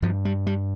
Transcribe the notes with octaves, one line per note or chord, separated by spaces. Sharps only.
G2 F3
G3
G3